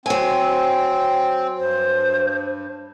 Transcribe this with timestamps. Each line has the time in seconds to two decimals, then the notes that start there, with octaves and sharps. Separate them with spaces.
0.06 F#3 C4 G#5
1.59 G2 C5